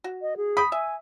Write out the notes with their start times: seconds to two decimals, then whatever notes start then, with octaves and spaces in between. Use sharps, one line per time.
0.04 F#4
0.22 D#5
0.37 G#4
0.57 G5 B5 D#6
0.72 E5 G#5